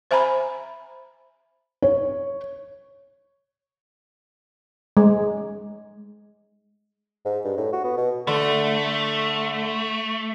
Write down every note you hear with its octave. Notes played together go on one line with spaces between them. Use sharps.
C5 E5 G#5 A#5 B5
C#5
G#3
G#2
G2
A2
F#4
B3
B2
D3 A3